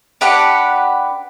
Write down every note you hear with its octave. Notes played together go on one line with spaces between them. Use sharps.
D4 G4 B4 F#5